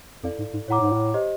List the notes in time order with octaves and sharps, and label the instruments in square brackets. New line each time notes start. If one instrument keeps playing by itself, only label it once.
[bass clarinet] F2 [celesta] E4 A4 D5 F5
[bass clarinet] G#2
G#2
[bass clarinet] A2 [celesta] C#5 F#5 A#5 D6
[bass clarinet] G#2
A2
[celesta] G4 C5 D#5